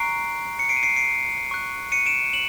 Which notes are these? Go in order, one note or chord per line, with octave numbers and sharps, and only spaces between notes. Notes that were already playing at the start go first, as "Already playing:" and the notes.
Already playing: A#5 C#6 F#6 C7 D7
C#7
C7 D7
D#7
C7 D7
C7 D7
C#6 F#6
C#7 D#7
D7 E7
E7 F#7